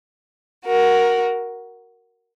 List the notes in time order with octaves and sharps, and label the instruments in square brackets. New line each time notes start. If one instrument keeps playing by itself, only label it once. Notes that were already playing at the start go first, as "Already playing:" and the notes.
[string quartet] F#4 A#4